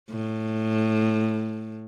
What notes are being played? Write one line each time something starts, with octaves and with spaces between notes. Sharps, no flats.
A2